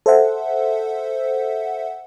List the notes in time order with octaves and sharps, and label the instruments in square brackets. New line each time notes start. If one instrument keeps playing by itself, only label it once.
[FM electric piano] A4 C5 E5 F#5